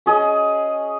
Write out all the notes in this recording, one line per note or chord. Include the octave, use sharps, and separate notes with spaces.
C#4 G#4 D#5